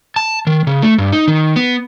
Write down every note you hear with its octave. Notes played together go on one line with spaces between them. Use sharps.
A5
D#3
C#3
A3
G2
D#4
D#3
B3